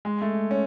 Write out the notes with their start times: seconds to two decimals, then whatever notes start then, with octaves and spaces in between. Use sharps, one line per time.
0.05 G#3
0.22 A3
0.51 C#4